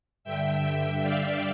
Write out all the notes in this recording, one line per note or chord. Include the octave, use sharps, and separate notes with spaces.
G2 D3 E5 G5
D5 F5